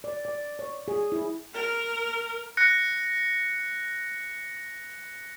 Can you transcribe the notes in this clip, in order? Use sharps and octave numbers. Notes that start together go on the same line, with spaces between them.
D5
D5
C#5
G#4
E4
A#4
F#6 A#6 C#7